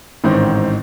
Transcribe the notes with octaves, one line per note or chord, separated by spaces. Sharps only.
A1 G#2 D#3 C4